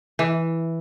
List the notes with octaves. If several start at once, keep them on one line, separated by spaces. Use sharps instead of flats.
E3